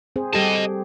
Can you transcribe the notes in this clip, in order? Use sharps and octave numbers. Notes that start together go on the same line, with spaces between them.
C4 G#4 C5
G3 G4 A4 D#5 A5